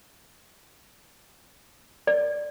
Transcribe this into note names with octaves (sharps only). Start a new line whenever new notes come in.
D5